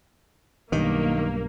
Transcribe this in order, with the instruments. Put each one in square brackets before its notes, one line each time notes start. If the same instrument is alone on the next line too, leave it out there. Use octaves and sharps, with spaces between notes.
[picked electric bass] B1 G2 [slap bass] D#3 [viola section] A#3